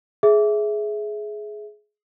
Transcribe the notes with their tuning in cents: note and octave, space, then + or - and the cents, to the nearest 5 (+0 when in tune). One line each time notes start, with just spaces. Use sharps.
G#4 +15 E5 +0